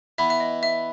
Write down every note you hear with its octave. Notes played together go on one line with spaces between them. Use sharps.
E3 B3 E4 E5
E5
D#5
E5